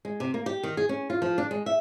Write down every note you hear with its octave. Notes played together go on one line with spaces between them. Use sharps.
G#3
C3
A#3
G4
D#3
G#4
C#4
F4
F3
D4
G#3
E5